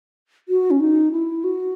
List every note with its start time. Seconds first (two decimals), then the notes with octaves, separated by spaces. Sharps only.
0.49 F#4
0.71 C#4
0.80 D#4
1.12 E4
1.44 F#4